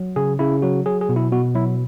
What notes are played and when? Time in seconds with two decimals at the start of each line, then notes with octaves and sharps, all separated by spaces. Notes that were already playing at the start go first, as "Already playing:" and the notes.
Already playing: F#3
0.16 C#3 G#4
0.39 C#3 E4
0.62 F#3 F#4
0.86 F#3 G#4
1.01 G#4
1.09 B2
1.16 E4
1.32 B2 F#4
1.55 F#3 E4